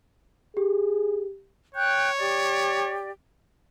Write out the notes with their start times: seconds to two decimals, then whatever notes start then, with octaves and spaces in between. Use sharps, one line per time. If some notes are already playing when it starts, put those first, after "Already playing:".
0.57 G4 G#4
1.74 C#5 G5 F#6 G6
2.17 G4 D5